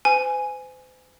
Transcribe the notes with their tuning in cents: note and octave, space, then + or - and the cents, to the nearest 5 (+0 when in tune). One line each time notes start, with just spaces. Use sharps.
C5 -45 G#5 +0